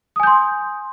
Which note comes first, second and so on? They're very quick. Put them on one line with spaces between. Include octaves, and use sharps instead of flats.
D#6 G#5 G6 C6